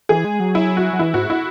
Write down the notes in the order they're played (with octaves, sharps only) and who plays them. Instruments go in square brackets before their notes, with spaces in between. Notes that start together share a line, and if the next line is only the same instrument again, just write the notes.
[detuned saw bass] E3 [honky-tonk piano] G#4
[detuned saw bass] G#3
F#3
[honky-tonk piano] E4
F#4
[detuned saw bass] F#3
[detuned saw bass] E3 [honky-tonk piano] E4
[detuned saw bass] G#2 [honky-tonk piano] F#4
[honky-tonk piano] E4